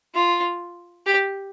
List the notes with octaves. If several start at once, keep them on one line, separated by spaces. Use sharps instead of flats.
F4
G4